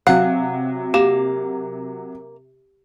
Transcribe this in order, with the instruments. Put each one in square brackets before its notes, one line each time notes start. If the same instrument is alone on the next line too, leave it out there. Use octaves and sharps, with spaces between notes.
[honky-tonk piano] C3 F#3 [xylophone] F5 [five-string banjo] F#5
[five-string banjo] A#3 [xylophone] G4